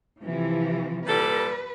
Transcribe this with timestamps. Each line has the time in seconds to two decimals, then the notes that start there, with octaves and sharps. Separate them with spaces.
0.23 C3 E3 F3
1.07 A#2 G3 A4 B4